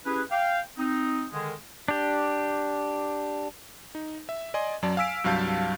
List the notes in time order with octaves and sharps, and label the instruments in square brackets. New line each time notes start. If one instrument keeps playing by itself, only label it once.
[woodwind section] C#4 E4 G4 G#4 B4
F5 G5
C4 D#4
D3 D#3 G#3
[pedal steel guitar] D4 G4
[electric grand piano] D#4
E5
D5 D#5 G#5 C6
F#2 F#3 D5 A5
F5 G#5 E6 B6 D7
C2 G2 F#3 F5 A5 G6